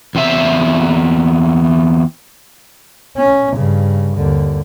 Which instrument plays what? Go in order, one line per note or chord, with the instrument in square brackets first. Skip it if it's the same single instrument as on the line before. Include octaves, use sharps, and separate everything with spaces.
[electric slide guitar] E2 C4 E5
[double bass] C#4
G2 C#3
D#2 D3